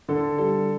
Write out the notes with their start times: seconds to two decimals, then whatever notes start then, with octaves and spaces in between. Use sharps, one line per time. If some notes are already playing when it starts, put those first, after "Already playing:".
0.08 D3 A4
0.38 G3 A4